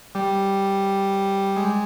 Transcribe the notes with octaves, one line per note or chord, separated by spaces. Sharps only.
G3
G#3